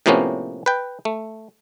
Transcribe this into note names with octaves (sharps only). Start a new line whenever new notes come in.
A2 C3 F3 A#3 B3 C#4
B4 G5
A3